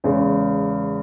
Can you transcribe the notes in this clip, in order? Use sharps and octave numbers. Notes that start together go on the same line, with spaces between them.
E2 C#3 G#3 C#4